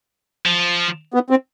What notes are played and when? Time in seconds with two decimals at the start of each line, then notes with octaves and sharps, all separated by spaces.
0.46 F3
1.14 B3
1.30 C4